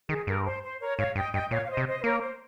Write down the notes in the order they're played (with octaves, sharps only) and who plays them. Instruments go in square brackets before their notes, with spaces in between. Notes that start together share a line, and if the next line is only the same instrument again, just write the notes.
[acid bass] D#3 [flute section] G#4
[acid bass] G2 [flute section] A#4
[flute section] C5
C5
A#4 C#5
[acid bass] G#2 [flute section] C#5 F5
[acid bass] G2 [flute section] D#5 G5
[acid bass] G2 [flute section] D#5 G5
[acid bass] A#2 [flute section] C#5 F5
[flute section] F5
C5 D#5
[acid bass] C3
[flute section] C5 D#5
C5
[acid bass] A#3 [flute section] A#4 C#5
[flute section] C5